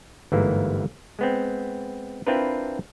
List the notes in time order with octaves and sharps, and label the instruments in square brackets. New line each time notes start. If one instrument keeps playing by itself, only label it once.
[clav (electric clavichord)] G1 G#2 E3 G#3 A#3
G#3 B3 C4
C4 D4 E4 F4 A#4 B4